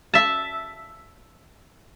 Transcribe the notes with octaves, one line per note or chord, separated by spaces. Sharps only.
E5 A5